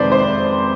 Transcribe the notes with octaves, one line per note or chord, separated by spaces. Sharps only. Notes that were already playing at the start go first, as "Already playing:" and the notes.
Already playing: F2 C3 D#3 G#3 B4 C5 D5
C5